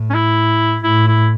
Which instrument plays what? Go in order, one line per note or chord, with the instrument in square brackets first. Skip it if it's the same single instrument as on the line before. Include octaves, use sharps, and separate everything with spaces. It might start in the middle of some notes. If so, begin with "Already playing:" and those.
Already playing: [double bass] A2
[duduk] C#4
E4
[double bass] A2 [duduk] E4
[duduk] E4